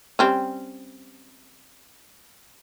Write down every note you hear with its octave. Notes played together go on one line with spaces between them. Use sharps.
G3 C4 C#4